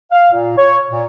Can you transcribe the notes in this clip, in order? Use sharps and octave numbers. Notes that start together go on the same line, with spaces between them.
F5
A#2
C#5
A#2